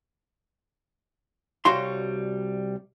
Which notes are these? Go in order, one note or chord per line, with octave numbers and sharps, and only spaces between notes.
C2 G3 F#4 C#5 F5 C6